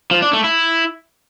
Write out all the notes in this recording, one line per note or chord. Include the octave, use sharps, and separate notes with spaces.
F3
D4
A3
E4